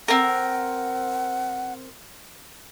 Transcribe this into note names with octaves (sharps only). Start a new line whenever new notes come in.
C4 A#4 F#5